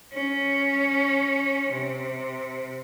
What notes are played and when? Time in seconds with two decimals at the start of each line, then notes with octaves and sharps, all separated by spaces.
0.14 C#4
1.72 C3